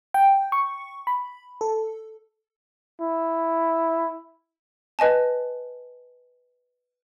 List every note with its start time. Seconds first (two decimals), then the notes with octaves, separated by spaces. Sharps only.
0.14 G5
0.52 C#6
1.07 B5
1.61 A4
3.01 E4
4.99 B4 D#5 G#5 A5